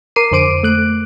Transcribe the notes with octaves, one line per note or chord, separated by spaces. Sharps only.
A#4 D6 C7 D#7
F2 D3 C5 D6 D7 D#7
A3 F#6 D7